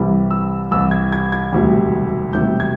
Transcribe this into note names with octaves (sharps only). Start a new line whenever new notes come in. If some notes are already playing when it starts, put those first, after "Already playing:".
Already playing: C2 C3 E3 G3
E6
C2 C3 E3 G3 E6
G#6
G#6
G#6
E1 D2 C3 D#3 G3
E1 D2 C3 D#3 G3 G6
G#6